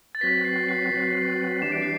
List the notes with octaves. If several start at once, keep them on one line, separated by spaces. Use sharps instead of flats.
A6
F#3 C4 F#4 B4 B6
C7
C7
F#3 C4 F#4 B4
E3 G3 D4 G4 E7
D7
C7